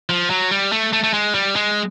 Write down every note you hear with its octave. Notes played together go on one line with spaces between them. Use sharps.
F3
F#3
G3
A3
A3
A3
G#3
G3
G#3